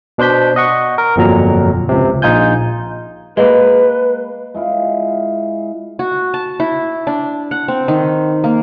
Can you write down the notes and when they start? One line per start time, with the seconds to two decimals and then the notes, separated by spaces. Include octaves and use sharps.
0.18 B2 D4 C5 G6 B6
0.56 D#5 F#5 C#6
0.98 A#4
1.16 G1 F2 A#2 F#3 A#5
1.89 C#2 C3
2.22 A#1 D#4 F4 G#5 G6
3.37 G#3 A#3 B4
4.54 G#3 E4 F4
5.99 F#4
6.34 A5
6.60 E4
7.07 D4
7.51 F#5
7.68 C4
7.88 D#3
8.44 A#3